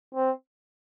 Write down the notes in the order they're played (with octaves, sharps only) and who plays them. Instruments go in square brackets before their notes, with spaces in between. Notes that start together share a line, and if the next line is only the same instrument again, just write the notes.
[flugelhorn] C4